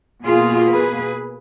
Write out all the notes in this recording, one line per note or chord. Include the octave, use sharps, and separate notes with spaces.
B2 A#3 F4 G#4
G#4 B4